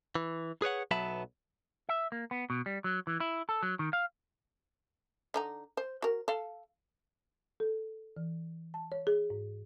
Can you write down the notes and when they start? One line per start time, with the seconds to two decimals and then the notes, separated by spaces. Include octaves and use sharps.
0.15 E3
0.62 G#4 B4 C#5 F#5
0.91 B1 F#3 B3 E5 A5 B5
1.89 E5
2.12 A#3
2.31 B3
2.50 B2
2.66 G3
2.84 F#3
3.07 E3
3.20 E4
3.49 A4
3.63 F#3
3.79 D#3
3.93 F5
5.34 D3 D#4 A#5
5.77 C5
6.02 F#4 A#4
6.28 A4 F5
7.60 A4
8.17 E3
8.74 A5
8.92 C#5
9.07 G#4
9.30 G#2